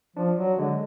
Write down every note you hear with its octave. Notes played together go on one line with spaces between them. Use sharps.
F3 D4
F#3
D3 G#3